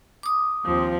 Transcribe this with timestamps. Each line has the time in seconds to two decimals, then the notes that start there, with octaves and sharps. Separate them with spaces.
0.23 D6 D#6
0.65 D#2 F3 C4